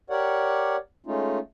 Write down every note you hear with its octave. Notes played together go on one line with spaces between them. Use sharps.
G4 A#4 C#5 D5 F#5
G#3 A3 C#4 D#4 F4